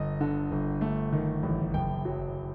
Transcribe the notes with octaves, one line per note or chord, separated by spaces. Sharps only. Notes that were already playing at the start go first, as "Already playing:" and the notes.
Already playing: G1 D#5
D3
G1
A3
D#3
A1
F#1 G5
F#3